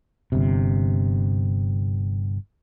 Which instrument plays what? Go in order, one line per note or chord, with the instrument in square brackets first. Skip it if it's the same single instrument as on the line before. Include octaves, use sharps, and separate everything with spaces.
[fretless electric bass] G1 C3